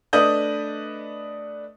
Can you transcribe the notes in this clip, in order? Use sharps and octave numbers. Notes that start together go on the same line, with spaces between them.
A3 D4 B4 D#5 D#6 G6